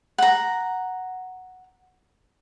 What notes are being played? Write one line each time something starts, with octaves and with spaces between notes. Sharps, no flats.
F#5 A#5